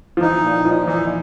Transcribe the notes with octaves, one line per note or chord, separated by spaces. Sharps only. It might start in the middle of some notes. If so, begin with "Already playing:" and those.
F3
E3 D#4
A#2
A#2 F3
E3 D#4